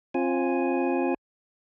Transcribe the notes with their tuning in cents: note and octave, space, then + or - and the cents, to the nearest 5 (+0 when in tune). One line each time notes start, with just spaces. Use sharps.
C4 +30 F4 +0 G#5 +0